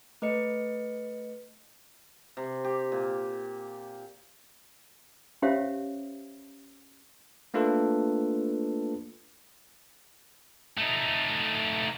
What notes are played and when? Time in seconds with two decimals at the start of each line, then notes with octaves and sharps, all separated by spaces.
0.22 A3 B4 D#5 C#7
2.37 C3
2.64 G4
2.92 A#2
5.42 C#4 G4 C5 C#5 E5 F5
7.54 A3 A#3 D4 F4 A4 B4
10.78 A3 D#4